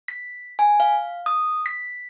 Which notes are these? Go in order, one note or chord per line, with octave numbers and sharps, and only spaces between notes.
B6
G#5
F5
D#6
B6